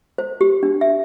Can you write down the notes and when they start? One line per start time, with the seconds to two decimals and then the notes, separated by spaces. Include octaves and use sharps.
0.18 C5
0.41 G4
0.63 D4
0.81 E5